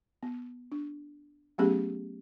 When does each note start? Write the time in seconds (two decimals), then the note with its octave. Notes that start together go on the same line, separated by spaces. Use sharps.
0.23 B3
0.72 D4
1.58 F#3 A3 B3 C#4 G4 G#4